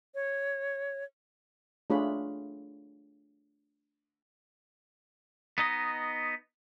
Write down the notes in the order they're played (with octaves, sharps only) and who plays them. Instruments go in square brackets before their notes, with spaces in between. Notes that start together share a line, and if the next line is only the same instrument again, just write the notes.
[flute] C#5
[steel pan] A3 D4 F4 G#4 C#5 B5
[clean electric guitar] B3 D#4 D#5